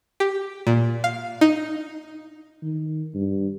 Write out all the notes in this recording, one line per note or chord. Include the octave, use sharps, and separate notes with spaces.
G4
A#2
F5
D#4
D#3
G2